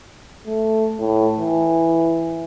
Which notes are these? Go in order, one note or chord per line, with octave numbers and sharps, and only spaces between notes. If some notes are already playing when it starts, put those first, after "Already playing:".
A3
A2
E3